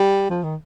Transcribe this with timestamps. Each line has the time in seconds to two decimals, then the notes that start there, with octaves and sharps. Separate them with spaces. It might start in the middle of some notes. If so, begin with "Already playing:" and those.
Already playing: G3
0.30 F3
0.44 D#3